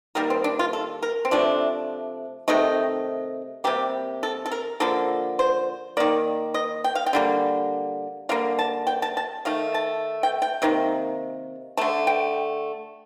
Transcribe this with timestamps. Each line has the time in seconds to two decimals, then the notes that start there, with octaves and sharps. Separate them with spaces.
0.15 D#3 G3 A#3 A#4
0.30 C4
0.44 D4
0.59 F4
0.73 A4
1.03 A#4
1.25 C4
1.31 C3 F3 A3 D4
2.48 C3 D#3 A3 D#4
3.64 C3 G3 A#3 G4
4.23 A4
4.46 A4
4.51 A#4
4.80 D3 F3 A#3 A4
5.39 C5
5.97 D#3 A#3 D5
6.54 D#5
6.84 G5
6.95 F5
7.06 G5
7.13 D3 G3 A#3
8.29 D3 G3 A#3 F5
8.59 A5
8.87 G5
9.02 A5
9.17 A5
9.45 D#3 A3 F5
9.74 A5
10.23 G5
10.42 G5
10.62 C3 D#3 A#3
11.77 D3 A3 A5
12.07 G5